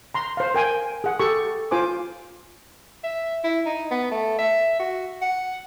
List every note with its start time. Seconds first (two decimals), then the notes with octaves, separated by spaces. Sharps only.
0.14 A#5 C6
0.37 C5 F5
0.54 A#4 G5 G#5
1.04 G#4 F#5
1.19 G4 A4 C#6
1.71 F4 C5 G#5 D6
3.04 E5
3.44 E4
3.66 D#4
3.91 B3
4.12 A3
4.39 E5
4.79 F#4
5.22 F#5